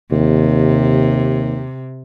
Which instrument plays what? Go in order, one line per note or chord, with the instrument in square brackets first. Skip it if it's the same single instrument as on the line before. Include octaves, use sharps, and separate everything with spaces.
[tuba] D#2 [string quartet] C3